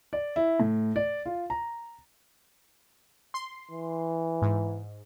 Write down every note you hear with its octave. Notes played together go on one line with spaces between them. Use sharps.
D5
E4
A2
D5
F4
A#5
C6
E3
G#2